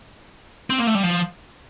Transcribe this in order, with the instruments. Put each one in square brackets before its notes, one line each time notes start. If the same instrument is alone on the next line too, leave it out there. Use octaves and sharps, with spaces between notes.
[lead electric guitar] C4
A#3
A3
G3
F3